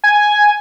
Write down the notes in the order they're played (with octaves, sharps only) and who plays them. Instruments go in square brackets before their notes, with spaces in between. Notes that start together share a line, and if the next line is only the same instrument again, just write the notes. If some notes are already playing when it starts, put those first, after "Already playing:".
[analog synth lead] G#5